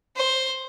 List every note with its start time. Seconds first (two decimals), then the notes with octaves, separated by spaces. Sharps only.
0.17 C5